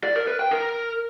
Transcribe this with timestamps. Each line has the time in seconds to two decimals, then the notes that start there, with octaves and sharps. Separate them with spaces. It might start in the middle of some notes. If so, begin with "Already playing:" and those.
0.04 D5
0.15 A#4
0.27 B4
0.39 G5
0.51 A#4